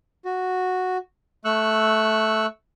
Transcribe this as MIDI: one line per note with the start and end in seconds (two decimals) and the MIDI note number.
0.25 0.97 66
1.45 2.46 57
1.45 2.46 85
1.45 2.46 88
1.45 2.46 90